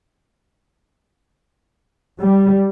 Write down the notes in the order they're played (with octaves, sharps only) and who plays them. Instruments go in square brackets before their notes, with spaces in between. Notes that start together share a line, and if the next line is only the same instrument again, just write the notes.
[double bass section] G3